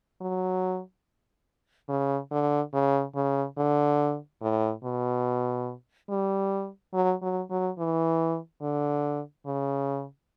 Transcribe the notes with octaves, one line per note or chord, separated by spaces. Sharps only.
F#3
C#3
D3
C#3
C#3
D3
A2
B2
G3
F#3
F#3
F#3
E3
D3
C#3